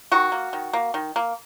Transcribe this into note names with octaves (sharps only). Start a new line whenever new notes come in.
D#3 F#4
A#3
D#3
A#3
D#3
A#3